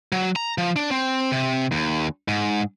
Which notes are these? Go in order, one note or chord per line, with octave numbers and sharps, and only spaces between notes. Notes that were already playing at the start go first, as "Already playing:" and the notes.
F#3
A#5
F3
D4
C4
C3
D#2
G#2